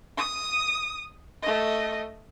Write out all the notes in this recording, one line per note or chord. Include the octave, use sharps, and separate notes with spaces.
D#6
A3 D#5